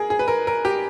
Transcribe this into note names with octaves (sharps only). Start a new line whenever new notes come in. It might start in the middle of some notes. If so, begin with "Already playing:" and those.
Already playing: G#4 A#4
G#4
B4
A#4
A#4
G4